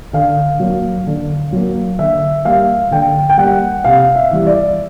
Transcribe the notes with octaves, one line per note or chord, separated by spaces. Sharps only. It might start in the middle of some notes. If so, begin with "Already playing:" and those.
D3 F5
F#3 A#3
D3
F#3 A#3
D3 E5
G3 A#3 F5
D3 G5
G5
G3 A#3 F#5
C3 F5
E5
E3 G3
D5